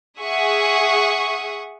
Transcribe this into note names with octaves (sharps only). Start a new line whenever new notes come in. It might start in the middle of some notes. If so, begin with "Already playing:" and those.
G#4 E5 F#5 C#6 D#6